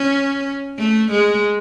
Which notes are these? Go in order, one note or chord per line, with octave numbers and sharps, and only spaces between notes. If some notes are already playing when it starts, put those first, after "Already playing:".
Already playing: C#4
A3
G#3